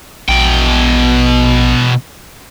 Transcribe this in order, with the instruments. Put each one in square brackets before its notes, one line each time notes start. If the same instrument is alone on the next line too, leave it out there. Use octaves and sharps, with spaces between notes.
[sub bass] A#1 [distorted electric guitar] B2 G5